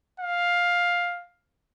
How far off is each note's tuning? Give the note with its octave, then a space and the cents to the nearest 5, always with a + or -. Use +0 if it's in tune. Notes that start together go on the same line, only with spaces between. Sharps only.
F5 +10